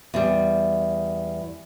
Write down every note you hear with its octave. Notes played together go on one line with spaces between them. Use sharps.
E2 G3